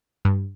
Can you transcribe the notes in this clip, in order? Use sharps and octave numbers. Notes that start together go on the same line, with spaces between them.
G2